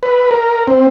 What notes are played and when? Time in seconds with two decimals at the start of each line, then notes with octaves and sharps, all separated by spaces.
0.03 B4
0.31 A#4
0.67 C4